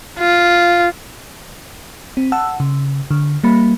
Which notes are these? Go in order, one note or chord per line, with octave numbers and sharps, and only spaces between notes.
F4
C4
F#5 A5 E6
C#3
D3
G3 A#3 B5